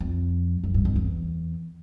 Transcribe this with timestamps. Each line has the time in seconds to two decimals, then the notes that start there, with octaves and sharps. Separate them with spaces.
0.01 F2
0.64 F#2
0.74 G2
0.85 F2
0.96 E2